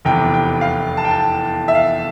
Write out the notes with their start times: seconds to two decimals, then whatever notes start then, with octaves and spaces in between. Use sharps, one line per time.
0.05 F1 E2 C3 G5
0.34 G5
0.61 F5
0.97 A5
1.05 G5
1.11 A5
1.68 E5
1.75 F5